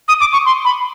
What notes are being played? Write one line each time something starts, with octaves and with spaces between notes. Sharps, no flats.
D#6
D6
C#6
C6
B5